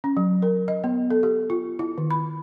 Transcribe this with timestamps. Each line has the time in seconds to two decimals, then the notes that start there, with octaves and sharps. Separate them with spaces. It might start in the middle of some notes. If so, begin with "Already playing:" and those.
0.04 C#4
0.17 F#3
0.42 A#4
0.68 D#5
0.84 B3
1.10 A4
1.23 G4
1.50 F4
1.79 E4
1.98 D#3
2.11 B5